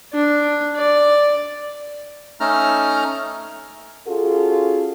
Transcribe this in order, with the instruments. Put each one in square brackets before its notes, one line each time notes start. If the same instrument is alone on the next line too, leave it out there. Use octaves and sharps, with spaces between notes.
[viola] D4
D5
[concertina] A3 C#4 D#4 A#5 F6
[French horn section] C#4 F4 F#4 G#4 A4